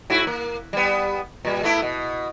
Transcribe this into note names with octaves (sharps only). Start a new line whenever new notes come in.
G#2 E4 F#4
A#3
G3 B3
A#2 G3
A3 B3 E4
B2